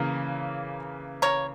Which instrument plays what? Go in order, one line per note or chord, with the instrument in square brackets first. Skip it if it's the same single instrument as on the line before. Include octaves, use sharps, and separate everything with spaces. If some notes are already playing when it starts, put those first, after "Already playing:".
Already playing: [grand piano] C#3 E3 A#3 [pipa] A#4
[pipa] A#4 C#5